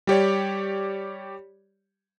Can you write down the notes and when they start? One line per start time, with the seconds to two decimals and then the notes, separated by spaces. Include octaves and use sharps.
0.07 G3 G4 C#5 D5